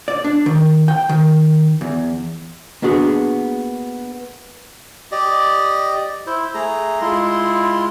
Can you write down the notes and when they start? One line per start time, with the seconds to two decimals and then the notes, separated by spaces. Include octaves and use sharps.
0.08 D5
0.25 D4
0.46 D#3
0.88 G5
1.09 D#3
1.81 E2
2.82 A#3 B3 D4 F#4 G#4
5.12 G4 D5 D#5
6.27 E4 C5
6.54 A3 G#4 A#5
7.01 G#3 E4 F4 C6